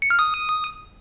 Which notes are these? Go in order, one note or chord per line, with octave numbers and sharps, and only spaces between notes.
C#7
F6
D#6